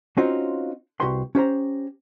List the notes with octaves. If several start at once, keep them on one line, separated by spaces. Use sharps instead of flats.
C4 C#4 D#4 F4 F#4 C5
C2 F#4 G4 B4 C6
C#4 G4 C5 A#5